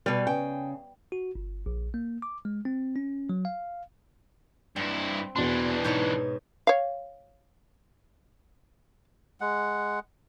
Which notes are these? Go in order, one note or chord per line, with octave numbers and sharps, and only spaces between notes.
B2 G3 B4
C#3 G5
F#4
G1
A#1
A#3
D6
G#3
C4
C#4
F#3
F5
G2 C4 E4
E2 B2 E3 D4 C6
G#2 B2 C#5 G6
C#5 F5
G#3 F#5